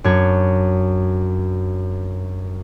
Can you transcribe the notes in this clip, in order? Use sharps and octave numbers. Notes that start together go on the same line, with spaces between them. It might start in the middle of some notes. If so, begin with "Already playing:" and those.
F#2 D4 C#5